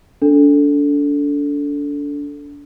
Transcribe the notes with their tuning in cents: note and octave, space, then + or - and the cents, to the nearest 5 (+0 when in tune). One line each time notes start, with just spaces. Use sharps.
D4 -30 A4 +0